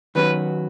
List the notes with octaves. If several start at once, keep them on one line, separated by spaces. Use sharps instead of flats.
D#3 F#3 C#4 F#4 B4